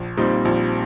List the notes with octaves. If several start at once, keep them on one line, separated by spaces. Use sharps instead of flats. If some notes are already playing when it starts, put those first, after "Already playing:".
Already playing: A#1
A#2 G3 C4 D#4
A#1